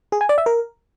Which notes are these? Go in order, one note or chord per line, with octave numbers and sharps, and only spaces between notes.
G#4
G#5
D5
E5
A#4